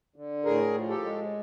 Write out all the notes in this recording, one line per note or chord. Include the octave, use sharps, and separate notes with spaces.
D3
A2 G#4 A#4
F3
G4 A4
G#3